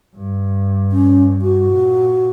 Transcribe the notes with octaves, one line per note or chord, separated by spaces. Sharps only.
G2
C#4
F#4
A#2